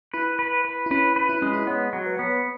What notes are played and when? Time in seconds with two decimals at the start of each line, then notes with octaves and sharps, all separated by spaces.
0.14 E4 B4
0.39 B4
0.65 B4
0.86 E4
0.91 C#4 B4
1.16 B4
1.29 E4
1.42 G#3 C#4
1.54 E4
1.67 B3 C#5
1.93 F#3
2.06 B4
2.18 B3 C#5
2.30 B4